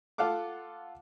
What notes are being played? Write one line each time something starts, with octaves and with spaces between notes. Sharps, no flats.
F4 A4 F5 F#5 D6